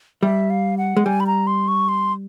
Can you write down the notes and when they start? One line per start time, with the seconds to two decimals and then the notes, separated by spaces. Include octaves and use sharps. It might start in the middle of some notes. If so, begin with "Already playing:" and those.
0.23 G3 E5
0.50 F5
0.78 F#5
0.97 G#3
1.06 G3 G#5
1.20 B5
1.27 A#5
1.47 C6
1.68 C#6
1.89 C6